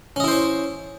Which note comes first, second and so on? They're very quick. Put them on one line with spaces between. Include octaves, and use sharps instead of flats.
C#4 D#5 E4 C5 C#5